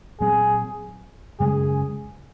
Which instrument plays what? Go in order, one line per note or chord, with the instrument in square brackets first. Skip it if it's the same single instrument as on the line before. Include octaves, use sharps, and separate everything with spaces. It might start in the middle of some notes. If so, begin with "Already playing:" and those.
[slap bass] A#2 F#3 C4 [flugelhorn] G#4
[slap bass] F#2 C#3 G#3 C#4 [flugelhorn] G#4